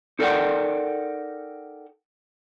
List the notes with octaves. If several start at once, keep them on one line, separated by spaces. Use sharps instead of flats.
D#4 A4 A#4 D5 F#5 G5